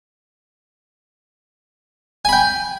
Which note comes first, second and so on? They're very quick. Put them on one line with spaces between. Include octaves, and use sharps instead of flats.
G#5 B5 G5